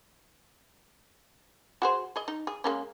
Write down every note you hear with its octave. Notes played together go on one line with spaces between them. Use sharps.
F#4 G#4 C5
G#4 D#5
D#4
G#4
G#3 A#3 C#4